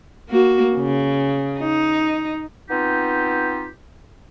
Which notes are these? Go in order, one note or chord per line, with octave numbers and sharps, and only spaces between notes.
A#3 F#4
C#3
D#4
B3 C4 D#4 F4 G4